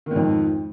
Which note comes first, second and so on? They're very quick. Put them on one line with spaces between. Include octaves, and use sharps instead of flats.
D#3 G#2 F2